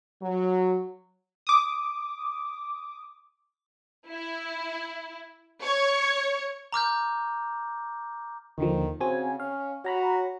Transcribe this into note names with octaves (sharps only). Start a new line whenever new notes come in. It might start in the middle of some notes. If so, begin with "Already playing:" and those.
F#3
D6 D#6
E4
C#5
A#5 D6 F6 G6
D#2 D3 D#3 F3
C#3 C4 F#4 G#5
C#4 F5
F#4 C#5 A#5 B5